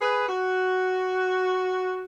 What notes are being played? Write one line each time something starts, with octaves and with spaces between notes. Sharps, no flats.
G#4 B4
F#4